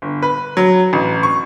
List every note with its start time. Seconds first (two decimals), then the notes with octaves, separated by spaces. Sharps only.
0.02 G1
0.22 B4
0.57 F#3
0.93 A1
1.23 C#6